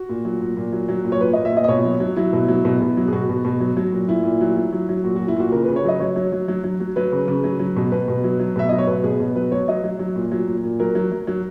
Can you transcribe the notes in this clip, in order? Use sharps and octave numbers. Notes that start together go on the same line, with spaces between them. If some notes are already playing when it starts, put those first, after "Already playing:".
Already playing: F#4
A#2
F#3
A#2
A#2
F#3
F#3
A#2
C#5
A#2 B4
A#2 D#5
E5
A#2 D#5
D#5
B2 C#5
F#3
F#3
F#3 E4
B2
F#3
B2
B2
F#3
G#4
B2 F#4
B2
B2
F#3
F#3
A#2
A#2 E4
A#2
F#3
F#3
F#3
F#3
A#2 F#4
A#2 F#4
E4
A#2 F#4
C#3 A#4
C#3 B4
C#5
F#3 D#5
F#3 C#5
F#3
F#3
F#3
F#3
F#3
F#3 B4
C#3
C#3
F#3
F#3
B2
B2 B4
B2
F#3
F#3
B2 E5
F#3 D#5
C#5
B2 B4
B2 G#4
B2
F#3 B4
F#3 C#5
F#3 D#5
F#3
F#3
A#2
F#3
A#2
A#2
F#3 A#4
F#3
F#3
F#3